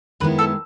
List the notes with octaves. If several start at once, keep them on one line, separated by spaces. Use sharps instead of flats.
F#2 D#3 G#3 B3 E4 B4
A4